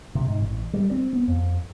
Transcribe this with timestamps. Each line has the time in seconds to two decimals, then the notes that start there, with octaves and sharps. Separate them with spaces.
0.15 C3
0.28 G#2
0.41 A1
0.73 G3
0.91 C4
1.13 B3
1.28 F2